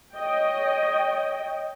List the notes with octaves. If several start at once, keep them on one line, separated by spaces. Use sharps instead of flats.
C#5 D#5 G5